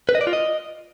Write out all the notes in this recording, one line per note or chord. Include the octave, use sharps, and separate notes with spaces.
B4
D#5
D5
F4
D#5